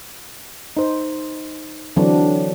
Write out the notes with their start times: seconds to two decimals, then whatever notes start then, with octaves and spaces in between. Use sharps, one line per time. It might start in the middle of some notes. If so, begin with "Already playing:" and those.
0.77 D#4 C5
1.96 D3 E3 F#3 C4 D4